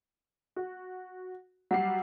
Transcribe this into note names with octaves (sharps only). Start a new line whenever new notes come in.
F#4
F#3 G3 F#5 C7